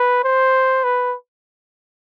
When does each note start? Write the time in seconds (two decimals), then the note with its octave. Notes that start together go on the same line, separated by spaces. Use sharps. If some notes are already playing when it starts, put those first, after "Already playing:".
Already playing: B4
0.24 C5
0.84 B4